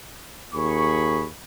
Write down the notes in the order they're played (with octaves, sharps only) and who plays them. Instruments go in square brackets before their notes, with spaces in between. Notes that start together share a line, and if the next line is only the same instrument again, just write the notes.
[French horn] D#2 [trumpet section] G#4 B5 C#6